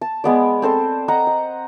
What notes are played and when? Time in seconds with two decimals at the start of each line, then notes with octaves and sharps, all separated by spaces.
0.01 A5
0.24 G#3 B3 D5
0.62 C4 A4 C5 A5
1.08 D#5 F#5 A#5
1.27 D#5